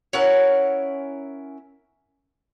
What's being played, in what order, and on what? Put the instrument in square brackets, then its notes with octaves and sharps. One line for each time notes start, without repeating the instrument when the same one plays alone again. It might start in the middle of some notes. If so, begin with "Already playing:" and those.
[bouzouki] C#4 E4 A#4 F#5